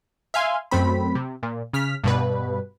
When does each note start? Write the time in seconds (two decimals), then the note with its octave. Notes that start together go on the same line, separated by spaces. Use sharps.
0.34 E5 F5 G#5 C6
0.71 F#2 A3 C4 B5
1.15 C3
1.43 A#2
1.73 C#3 F6 B6
2.04 G2 B2 B4